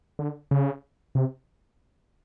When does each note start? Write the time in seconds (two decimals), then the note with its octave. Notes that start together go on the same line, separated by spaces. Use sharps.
0.19 D3
0.51 C#3
1.15 C3